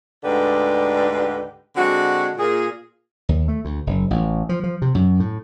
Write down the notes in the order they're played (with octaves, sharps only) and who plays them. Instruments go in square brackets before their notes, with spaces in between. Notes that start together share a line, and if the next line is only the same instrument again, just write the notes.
[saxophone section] D2 G#2 D3 G4 B4 D5
D3 G#3 C4 D4 F#4
A#2 G#4
[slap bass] D#2
A3
D2
F#1
A1
F3
F3
C3
F#2
A2